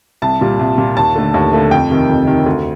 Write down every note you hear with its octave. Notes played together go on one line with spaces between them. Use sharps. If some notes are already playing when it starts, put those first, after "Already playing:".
C2 A5
A#2 G3
C2
A#2 G3
D#2 A5
D3 A3
D#2
D3 A3
F2 G5
C3 D#3
F2
C3 D#3
D2